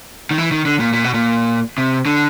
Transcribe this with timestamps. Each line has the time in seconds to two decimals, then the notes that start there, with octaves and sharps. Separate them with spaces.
0.31 D#3
0.38 E3
0.51 D#3
0.66 D3
0.79 A#2
0.93 A#2
1.04 B2
1.14 A#2
1.78 C3
2.06 D3